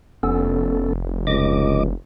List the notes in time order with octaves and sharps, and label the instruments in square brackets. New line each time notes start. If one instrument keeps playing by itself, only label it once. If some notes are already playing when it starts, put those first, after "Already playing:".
[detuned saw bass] F1 [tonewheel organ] B3 C#4 A4
[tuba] C#2 [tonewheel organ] D#5 D6